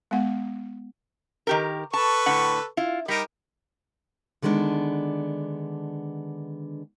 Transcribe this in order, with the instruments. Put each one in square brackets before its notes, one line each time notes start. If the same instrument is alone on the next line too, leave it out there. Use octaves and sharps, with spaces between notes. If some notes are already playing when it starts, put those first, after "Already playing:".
[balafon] G#3 B3 F#5
[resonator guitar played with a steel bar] D#3 G4 A#4
[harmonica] A4 B4 C#6 [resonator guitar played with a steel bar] A5
[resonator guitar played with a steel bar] A2 D3 F#5
E4 F4
[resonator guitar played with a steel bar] G3 [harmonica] D#4 G4 A#4
[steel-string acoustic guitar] D3 D#3 G#3 B3 D4